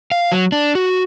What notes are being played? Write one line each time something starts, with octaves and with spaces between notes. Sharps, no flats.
F5
F#3
D4
F#4